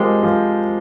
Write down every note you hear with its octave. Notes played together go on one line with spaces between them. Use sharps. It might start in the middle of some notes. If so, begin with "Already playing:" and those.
Already playing: F3 G#3 C4 G4 A#4
F3